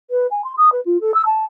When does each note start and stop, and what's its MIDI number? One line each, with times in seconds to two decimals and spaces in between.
0.11 0.27 71
0.31 0.42 80
0.44 0.53 84
0.58 0.70 87
0.72 0.81 71
0.85 1.00 65
1.01 1.14 69
1.14 1.22 88
1.26 1.45 81